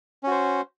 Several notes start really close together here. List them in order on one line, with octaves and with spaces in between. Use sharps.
C#4 F#4 C5